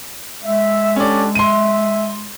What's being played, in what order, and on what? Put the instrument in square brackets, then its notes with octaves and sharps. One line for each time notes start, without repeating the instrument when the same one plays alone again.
[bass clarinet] G#3 [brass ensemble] E5
[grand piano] C#4 D5 [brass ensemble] D4 G4 A4
[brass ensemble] E5 [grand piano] C6 D#7